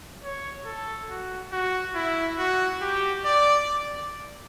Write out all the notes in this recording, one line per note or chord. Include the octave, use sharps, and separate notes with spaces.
C#5
A4
F#4
F#4
E4
F#4
G4
D5